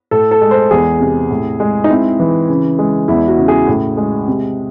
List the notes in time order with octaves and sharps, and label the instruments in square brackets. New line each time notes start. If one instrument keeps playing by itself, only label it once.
[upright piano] A2 A4
A4
G#3
C5
E2 G#4
C3
A2
G#3
D#4
C4 E4
E3
C#3
G#3
E2 E4
F#4
C#3
G#4
A2
G#3
C3